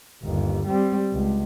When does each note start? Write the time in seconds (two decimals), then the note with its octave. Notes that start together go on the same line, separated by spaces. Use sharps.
0.23 G1 D#2
0.66 G3 C4
1.12 C#2